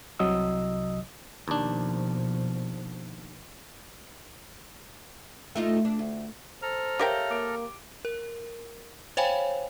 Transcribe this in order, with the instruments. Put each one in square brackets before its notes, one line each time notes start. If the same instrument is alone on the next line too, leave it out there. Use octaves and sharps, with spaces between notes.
[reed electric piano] C2 C3 F#3 D#5 D#6 E6
[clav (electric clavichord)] D#2 D4 [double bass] B2 F3
[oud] A3 D#4 F4
D4
D2
[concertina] A4 A#5 F6 [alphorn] C5
[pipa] G4 A#4 G5 [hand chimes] C#5 E5 F5
[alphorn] A#3 [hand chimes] D6 D7
[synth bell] A#4
C5 C#5 F5 G5 G#5 B5